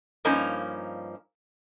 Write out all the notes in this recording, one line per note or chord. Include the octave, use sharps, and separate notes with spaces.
G2 F3 A#3 C#4 D#4